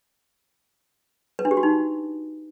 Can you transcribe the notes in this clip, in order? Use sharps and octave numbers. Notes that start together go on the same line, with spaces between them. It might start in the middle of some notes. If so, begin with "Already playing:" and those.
B4
D4
G4
F#4
D#4